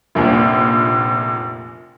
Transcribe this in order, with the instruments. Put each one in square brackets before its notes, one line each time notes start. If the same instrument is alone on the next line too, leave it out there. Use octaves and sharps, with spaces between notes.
[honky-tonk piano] F1 A#1 A#2